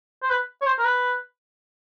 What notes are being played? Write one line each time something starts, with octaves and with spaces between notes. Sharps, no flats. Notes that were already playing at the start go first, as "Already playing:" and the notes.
C5
B4
C#5
C5
A#4
B4